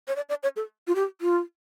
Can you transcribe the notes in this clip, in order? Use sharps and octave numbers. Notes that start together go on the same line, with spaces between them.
C#5
D5
D5
C#5
A4
F4
G4
F4